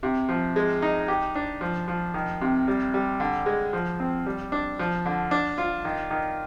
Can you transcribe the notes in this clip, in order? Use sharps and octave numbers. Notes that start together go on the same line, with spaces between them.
C3
F3
G#3
D#4
G4
D4
F3
F3
D#3
C3
G3
G3
D3
G#3
F3
C4
G3
D4
F3
D3
D4
F4
D#3
D#3